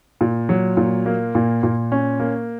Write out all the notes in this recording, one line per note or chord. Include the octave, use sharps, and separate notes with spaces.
A#2
F#3
A#2
A#3
A#2
A#2
C#4
A#3